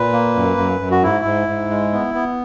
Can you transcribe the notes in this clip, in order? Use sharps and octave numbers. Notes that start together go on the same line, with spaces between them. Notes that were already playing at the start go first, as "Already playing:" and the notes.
Already playing: A#2 B4
A#3
F#2
F#2
F#2
F#4
G#2 E4
G#2
G#2
G#3
B3
B3